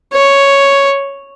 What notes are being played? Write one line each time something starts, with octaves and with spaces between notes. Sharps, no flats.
C#5